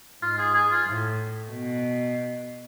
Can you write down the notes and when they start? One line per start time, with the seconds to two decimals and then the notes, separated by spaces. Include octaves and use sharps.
0.22 G#2 F4
0.38 G#4
0.54 G#4
0.71 F4
0.86 A2
1.50 B2